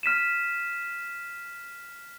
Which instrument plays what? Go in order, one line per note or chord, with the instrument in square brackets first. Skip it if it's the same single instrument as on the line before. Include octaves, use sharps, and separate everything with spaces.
[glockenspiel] F6 B6 D#7 E7